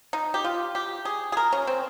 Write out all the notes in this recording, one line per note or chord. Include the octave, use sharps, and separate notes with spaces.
D#4
G4
F4
G4
G#4
G#4
A#4
C#4
C4